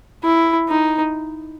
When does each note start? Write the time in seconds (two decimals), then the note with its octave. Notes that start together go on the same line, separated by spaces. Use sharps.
0.24 E4
0.69 D#4